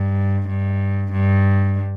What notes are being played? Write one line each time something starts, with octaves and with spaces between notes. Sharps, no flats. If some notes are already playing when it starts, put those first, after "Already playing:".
Already playing: G2
G2
G2